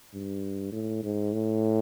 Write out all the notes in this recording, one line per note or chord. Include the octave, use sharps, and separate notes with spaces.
G2
A2
G#2
A2